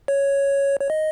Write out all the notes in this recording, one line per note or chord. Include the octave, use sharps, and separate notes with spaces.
C#5
C#5
D#5